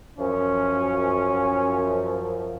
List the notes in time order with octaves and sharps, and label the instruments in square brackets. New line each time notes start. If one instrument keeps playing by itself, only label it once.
[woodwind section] F#2 F3 [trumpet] C#4